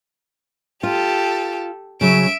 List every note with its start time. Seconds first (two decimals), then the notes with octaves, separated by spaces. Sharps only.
0.83 F4 G4 A4
2.01 C#3 F#3 E5 D7